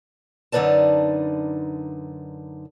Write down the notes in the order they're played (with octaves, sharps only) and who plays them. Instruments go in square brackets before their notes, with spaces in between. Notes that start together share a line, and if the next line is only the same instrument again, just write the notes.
[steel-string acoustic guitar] F#2 D3 D#4 B4 D5 A5